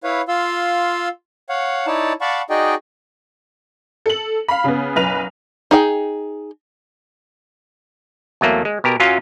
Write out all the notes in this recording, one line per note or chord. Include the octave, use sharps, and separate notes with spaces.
E4 B4 C#5 F5
F4 F5 C6 E6
C#5 F5 F#5
D#4 E4 C#5 D5 A5
D5 F5 F#5 A5 B5 C#6
D#4 F#4 G#4 D5 D#5 G5
A4 F#7
F5 B5
C#3 B3
F#1 B1 B4 F7
D#4 G#4 G5
E2 F#3 A3 A#3
G#3
B2 G4 A#4
F#2 F#3 C#4 F4 F5 G#5